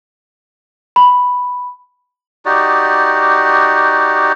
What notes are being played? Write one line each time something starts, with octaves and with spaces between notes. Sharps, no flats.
B5
D#4 F#4 G4 D5